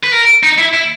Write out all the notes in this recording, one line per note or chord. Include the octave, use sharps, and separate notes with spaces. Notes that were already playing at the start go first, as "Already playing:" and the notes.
B4
A#4
D#4
E4
E4